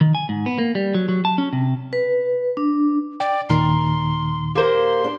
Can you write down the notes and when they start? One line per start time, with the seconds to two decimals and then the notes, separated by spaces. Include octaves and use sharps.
0.01 D#3
0.15 G#5
0.29 G#2
0.46 B3
0.59 A#3
0.75 G3
0.94 F#3
1.09 F#3
1.25 A5
1.38 C#4
1.53 C3
1.93 B4
2.57 D4
3.20 D5 G5
3.50 D#2 A#2 D#3 A#4 C6
4.55 A#3 G4 A#4 C5 C6
5.04 D4